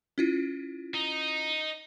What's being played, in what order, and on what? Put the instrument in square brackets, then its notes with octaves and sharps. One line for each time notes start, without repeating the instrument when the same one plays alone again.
[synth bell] C#4 E4 F4
[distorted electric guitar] D#4